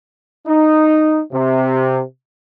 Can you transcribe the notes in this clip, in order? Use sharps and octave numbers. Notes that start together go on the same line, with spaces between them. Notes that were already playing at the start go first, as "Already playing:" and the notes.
D#4
C3